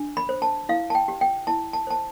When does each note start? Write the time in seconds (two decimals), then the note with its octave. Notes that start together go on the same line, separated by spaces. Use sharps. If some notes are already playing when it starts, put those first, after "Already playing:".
Already playing: D4
0.17 B5
0.29 C5
0.42 A5
0.69 E4 F5
0.90 A5
0.95 G5
1.08 G4
1.21 G5
1.47 E4 A5
1.73 A5
1.87 C5 A5